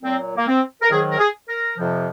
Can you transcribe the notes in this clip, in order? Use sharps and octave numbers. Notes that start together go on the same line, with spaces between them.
A#2 F#3 C4
A#3
C4
A#4
G#2 D#3 F#3 G#4
A#4
G#4
A#4
F2 C3 F3